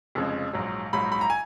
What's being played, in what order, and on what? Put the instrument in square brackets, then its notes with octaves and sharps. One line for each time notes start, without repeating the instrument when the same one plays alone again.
[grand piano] F1 F2 C#3 G#3
A#1 G#2 F#3
A#1 G#2 F#3 B5
B5
A#5
G#5